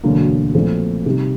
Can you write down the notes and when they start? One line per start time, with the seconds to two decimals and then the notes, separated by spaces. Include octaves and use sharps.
0.03 E1 D2 D3 F#3 A#3
0.54 A#1 A#2 F#3 A3 C4
1.06 C3 D#3 G3